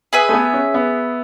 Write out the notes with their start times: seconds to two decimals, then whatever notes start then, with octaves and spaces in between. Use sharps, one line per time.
0.13 G#4 B4 E5 G#5
0.29 A3
0.33 B3
0.54 C#4
0.74 B3